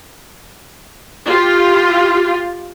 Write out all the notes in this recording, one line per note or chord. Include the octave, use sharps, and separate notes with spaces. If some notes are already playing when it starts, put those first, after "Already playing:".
F4 G4